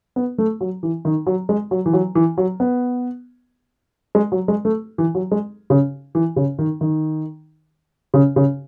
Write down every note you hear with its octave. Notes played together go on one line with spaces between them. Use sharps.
B3
A3
F#3
E3
D#3
F#3
G#3
F#3
E3
F#3
E3
F#3
B3
G#3
F#3
G#3
A3
E3
F#3
G#3
C#3
E3
C#3
D#3
D#3
C#3
C#3